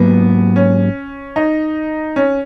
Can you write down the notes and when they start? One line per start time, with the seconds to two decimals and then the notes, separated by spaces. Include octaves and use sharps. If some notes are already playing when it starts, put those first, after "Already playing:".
Already playing: G#2 F#3 A#3 B3
0.56 C#4
1.36 D#4
2.16 C#4